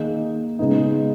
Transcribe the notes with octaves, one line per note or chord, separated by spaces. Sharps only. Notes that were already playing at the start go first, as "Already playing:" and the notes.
Already playing: D#3 A#3 D#4 G#4
C#3 G#3 B3 D#4